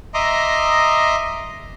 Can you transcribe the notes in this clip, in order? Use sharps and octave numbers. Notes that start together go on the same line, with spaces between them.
D#5 E5 A#5 C6 D6 D#6